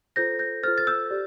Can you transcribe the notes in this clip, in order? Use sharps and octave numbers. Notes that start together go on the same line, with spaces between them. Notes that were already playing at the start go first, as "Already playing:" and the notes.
F4 A4 C5 G6 A#6
G6 A#6
F4 A4 C5 F6 A6
A6
E6 G6
G4 D5